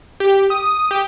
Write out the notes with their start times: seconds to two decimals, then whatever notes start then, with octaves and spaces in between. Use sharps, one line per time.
0.20 G4
0.50 D#6
0.91 G4